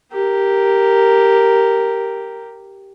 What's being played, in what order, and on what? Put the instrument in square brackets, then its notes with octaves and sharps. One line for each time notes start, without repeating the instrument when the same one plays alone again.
[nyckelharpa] G4 A#4